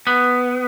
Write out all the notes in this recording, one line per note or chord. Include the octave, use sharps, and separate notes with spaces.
B3